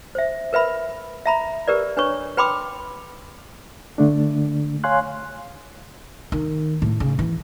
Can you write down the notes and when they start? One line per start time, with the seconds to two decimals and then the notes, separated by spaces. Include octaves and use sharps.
0.15 C5 E5
0.53 A#4 B4 E5 B5
1.26 E5 A#5 B5
1.68 G4 A#4 B4 D5
1.97 D4 B4 C#5 C#6
2.37 B4 G5 B5 C6 D6 E6
3.98 D3 A3 D4
4.84 C#5 F5 G#5 C6 F#6
6.32 D#3
6.82 A2
7.00 C#3
7.19 E3